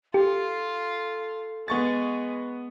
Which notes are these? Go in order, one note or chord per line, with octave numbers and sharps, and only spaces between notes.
F4 G4 A4
G#3 B3 C#6 A6